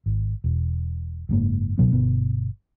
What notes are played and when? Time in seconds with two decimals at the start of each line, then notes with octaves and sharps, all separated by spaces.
0.06 G#1
0.44 E1
1.29 F#1 G#2 A#3
1.78 C#2 B2 F#3 B3
1.91 G1 B2 B3